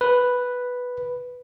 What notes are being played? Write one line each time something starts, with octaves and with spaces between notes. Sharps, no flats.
B4